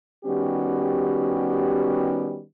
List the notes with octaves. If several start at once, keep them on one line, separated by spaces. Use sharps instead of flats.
D#3 G3 B3 C#4 F#4 G4